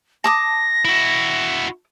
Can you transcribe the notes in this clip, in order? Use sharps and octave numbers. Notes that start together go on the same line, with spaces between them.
A5 D6 D#6 A#6
E4 F#4